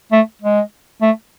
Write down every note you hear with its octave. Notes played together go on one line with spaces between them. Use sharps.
A3
G#3
A3